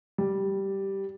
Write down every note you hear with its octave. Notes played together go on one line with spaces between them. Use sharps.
G3